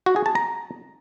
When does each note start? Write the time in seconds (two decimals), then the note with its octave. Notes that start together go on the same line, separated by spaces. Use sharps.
0.06 F#4
0.16 G#4
0.26 A5
0.35 A#5